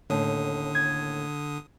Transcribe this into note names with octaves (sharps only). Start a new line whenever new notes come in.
D#2 A2 D3 C#4 D#6
G#6